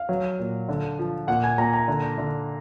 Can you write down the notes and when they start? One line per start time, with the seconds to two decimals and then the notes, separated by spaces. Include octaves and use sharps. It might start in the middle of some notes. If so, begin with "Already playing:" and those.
Already playing: F5
0.09 F#3
0.39 A#2
0.68 D3
0.99 F3
1.27 A#2 F#5
1.44 G#5
1.58 A#2 A#5
1.73 A#5
1.88 D3
2.18 D3